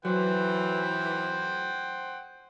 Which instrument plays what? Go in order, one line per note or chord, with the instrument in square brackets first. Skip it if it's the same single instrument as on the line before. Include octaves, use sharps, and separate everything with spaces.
[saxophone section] E3 [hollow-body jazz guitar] F#3 [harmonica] C5 F#5 G5